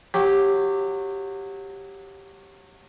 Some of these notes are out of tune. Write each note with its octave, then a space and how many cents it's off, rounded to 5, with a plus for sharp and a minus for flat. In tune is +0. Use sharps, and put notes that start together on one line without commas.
F#3 -20 G4 +0